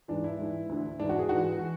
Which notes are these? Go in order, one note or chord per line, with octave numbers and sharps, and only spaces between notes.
G#2 E3 D4
E4
G#2 E3
D2 D3
G#2 E3 D4
F#4
G#4
G#2 E3 F#4
E3